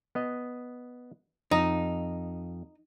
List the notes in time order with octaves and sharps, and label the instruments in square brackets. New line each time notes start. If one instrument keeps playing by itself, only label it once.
[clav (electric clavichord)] B3 D#5
[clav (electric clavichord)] F2 [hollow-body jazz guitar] D#4